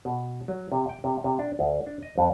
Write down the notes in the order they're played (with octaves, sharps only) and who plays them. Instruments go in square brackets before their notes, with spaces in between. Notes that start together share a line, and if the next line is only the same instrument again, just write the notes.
[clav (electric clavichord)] B2
F#3
C3
G5
C3
C3
D4
D2
D4
D#5
F2